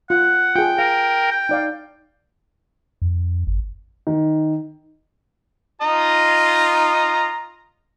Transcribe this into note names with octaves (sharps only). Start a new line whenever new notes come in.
F4 F#5
F4 G#4 G5
A#4 F5
G5
D#4 D5 F5
F2
G1
D#3
F4 D#5 A#5